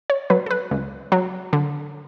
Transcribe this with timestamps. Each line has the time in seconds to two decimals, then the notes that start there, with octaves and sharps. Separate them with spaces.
0.10 C#5
0.30 F#3 B4
0.46 A4
0.51 B4
0.71 C#2
1.12 F#3
1.53 D3